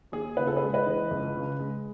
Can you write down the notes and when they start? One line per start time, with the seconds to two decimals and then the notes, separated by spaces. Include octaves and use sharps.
0.12 D#2 G#4
0.37 C#3 B4
0.47 A4
0.56 G#4 B4
0.62 G#3
0.74 B4 D#5
0.86 E3
1.11 C#2
1.35 C#3
1.59 G#3